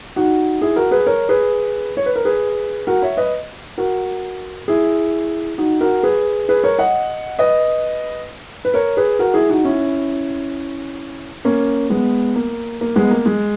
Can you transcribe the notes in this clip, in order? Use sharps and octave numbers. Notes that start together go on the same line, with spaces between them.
D#4 F#4
E4 G#4
F#4 A#4
G#4 B4
A#4 C#5
G#4 B4
C#5
B4
A#4
G#4 B4
F#4 A#4
C#5 E5
B4 D#5
F#4 A#4
E4 G#4
D#4 F#4
F#4 A#4
G#4 B4
G#4 B4
A#4 C#5
D#5 F#5
B4 D#5
B4
A#4 C#5
G#4 B4
F#4 A#4
E4 G#4
D#4 F#4
C#4 E4
A#3 C#4
G#3 B3
A#3
A#3
G#3 B3
A#3
G#3